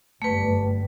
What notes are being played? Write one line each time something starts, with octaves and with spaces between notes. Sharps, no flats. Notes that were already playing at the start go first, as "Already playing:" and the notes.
G1 F#2 G3 A3 B4